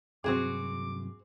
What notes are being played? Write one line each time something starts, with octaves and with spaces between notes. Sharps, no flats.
G2 C3 F#3 C4 F#4 G#4 D6